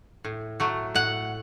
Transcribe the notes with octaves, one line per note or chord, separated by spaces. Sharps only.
A2
F#3 A3
A2 F#5